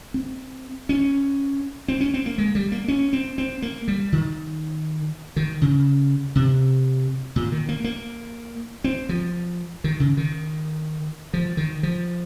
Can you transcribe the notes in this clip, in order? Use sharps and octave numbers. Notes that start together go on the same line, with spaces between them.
C4
C#4
C4
C#4
C4
A#3
G#3
G3
A#3
C#4
C4
C4
A#3
G3
D#3
D#3
C#3
C3
A#2
D#3
A#3
A#3
C4
F3
D#3
C#3
D#3
F3
D#3
F3